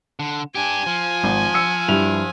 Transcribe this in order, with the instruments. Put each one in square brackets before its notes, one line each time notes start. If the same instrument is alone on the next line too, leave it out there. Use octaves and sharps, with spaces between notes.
[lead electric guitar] D3
[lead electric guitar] D4 G4 [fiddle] G#5
[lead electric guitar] F3
[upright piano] G#1
E6 C#7
G2 E4 F7